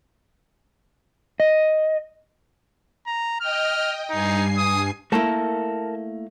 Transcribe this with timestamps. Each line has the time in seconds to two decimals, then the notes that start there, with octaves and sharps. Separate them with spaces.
1.40 D#5
3.07 A#5
3.41 D#5 G5 F6
4.10 G2 D#4 G#5 C7
4.57 D#6
5.12 A3 A#3 E4 A#4 A5